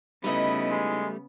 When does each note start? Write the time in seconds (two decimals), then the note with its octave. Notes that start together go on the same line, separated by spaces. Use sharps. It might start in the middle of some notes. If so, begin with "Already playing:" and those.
0.24 C#3 G3 A3 B3 D#4 E4 B4 D#5
0.70 G#3